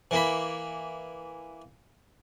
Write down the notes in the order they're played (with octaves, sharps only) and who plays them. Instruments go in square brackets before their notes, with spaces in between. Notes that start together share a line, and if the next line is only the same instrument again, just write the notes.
[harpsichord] E3 A#3 B5